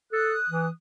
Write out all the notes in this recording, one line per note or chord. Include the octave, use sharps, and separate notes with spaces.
A4 D#6 F#6
E3